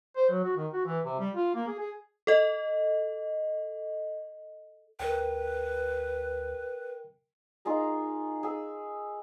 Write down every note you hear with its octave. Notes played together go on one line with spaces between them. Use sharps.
C5
F#3
F#4
D#3
F#4
E3
C3
G3
F4
A#3
G#4
G#4
A4 D#5
D2 A#4 B4 G5
D#4 F4 G#4 A#4
G#4 E6